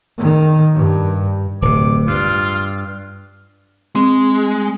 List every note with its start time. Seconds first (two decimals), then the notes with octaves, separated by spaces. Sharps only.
0.22 D#3
0.74 G2
1.62 D1 C3 D6
2.07 G2 F4
3.95 G#3 C4